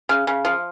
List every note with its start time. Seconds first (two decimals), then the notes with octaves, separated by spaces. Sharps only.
0.09 C#3
0.27 C#3
0.45 F3